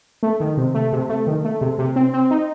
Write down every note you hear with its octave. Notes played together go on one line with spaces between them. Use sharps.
A3
D#3
C3
A3
C3
A3
D#3
A3
C3
C3
C4
C4
D#4